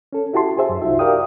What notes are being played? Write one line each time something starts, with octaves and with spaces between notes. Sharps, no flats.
C#4 A4
E4 F#4 G4 A5 C6
G4 G#4 C5 E5
F#2
C2 D#4 F4 F#4 E5
G4 A#4 D5 F5 G5 D#6